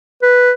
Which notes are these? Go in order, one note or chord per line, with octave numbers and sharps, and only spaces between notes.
B4